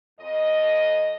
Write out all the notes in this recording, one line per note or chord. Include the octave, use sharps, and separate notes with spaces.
F2 D#5